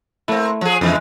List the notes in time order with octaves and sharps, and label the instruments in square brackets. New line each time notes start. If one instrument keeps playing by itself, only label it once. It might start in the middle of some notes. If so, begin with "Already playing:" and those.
[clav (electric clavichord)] A3 E4 [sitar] A#3 C4
[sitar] F3 G#4
[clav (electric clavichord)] F2 E4 [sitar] C#3 E3 G#3